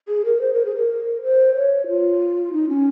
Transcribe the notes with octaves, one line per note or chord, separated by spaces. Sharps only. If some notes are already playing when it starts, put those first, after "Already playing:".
G#4
A#4
C5
A#4
G#4
A#4
C5
C#5
F4
D#4
C#4